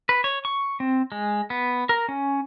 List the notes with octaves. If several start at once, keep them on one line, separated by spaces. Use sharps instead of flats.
B4
C#5
C#6
C4
G#3
B3
A#4
C#4